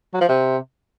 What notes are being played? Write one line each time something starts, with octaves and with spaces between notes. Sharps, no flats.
F#3
F3
C3